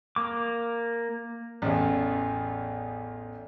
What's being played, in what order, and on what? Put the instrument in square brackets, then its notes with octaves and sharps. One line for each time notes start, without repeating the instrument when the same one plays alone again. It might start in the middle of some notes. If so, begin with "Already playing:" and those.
[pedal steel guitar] A#3 D6
[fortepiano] A1 E2